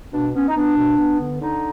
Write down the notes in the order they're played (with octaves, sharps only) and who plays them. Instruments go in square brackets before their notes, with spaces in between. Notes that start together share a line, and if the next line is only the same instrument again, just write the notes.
[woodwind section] B2 D4
B3 C#4
D#4
B3 D4
B2
B3
D3
D3 D#4